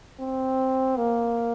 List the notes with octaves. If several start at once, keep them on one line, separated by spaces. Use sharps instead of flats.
C4
A#3